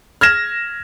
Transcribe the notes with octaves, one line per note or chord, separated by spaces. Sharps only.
F6 G#6 A#6 E7